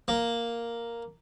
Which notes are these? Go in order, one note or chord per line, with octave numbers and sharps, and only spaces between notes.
A#3